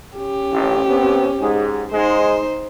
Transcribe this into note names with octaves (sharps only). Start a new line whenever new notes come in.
C#4 G4
A1 F2
C3 B3 C4
G#2 G#4
G#2 G#3 D#4 C5